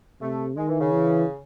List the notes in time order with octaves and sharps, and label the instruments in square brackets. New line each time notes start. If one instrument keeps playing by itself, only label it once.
[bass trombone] C3 [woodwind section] A3
[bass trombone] D#3 [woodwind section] G#3
[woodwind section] E3
C#3
[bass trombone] E3